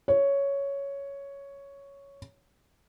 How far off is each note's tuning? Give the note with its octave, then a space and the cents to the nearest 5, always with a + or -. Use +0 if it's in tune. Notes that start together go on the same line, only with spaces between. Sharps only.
C#5 +5